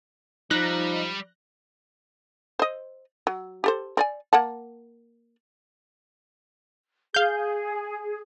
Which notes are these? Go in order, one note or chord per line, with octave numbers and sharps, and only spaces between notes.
F3 G3 D#4 F#6 A#6
C5 D#5
F#3
G4 A4 C5
C4 D5 G#5
A#3 F#5 A5
G#4 F5 G6